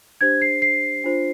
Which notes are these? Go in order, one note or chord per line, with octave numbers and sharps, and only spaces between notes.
D4 G4 C5 G#6
C7
C7
D4 F4 C5